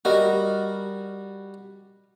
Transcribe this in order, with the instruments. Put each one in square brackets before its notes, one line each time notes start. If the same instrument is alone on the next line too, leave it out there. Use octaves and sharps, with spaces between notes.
[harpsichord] G3 F#4 [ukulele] A#4 D#5